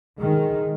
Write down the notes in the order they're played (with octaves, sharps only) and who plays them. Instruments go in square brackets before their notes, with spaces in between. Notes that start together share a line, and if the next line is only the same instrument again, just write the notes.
[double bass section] D#3 [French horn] G#3